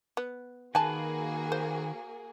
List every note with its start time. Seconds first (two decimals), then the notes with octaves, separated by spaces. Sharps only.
0.17 B3
0.75 D#3 A#3 F#4 G#4 B4 G#5 A5
1.52 C5